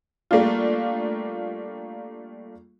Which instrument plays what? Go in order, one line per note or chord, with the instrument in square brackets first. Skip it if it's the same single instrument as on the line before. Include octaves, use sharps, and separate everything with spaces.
[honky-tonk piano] G3 A3 A#3 D4 F4